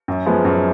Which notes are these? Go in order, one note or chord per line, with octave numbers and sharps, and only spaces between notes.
F#2
F3 G#3 B3
F#2